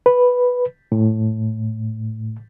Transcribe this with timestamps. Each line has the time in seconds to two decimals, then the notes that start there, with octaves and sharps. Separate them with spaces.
0.06 B4
0.92 A2